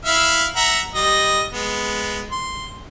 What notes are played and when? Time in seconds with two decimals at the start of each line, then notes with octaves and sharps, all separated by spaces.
0.05 E4 E5 F5
0.56 E5 F#5 A#5
0.95 G3 D#5
1.52 G#3 B3
2.31 C6